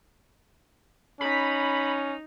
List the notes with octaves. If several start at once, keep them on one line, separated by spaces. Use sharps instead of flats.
C#4 D#4 B5